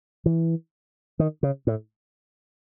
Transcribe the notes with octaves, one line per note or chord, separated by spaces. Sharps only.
E3
D#3
C#3
A2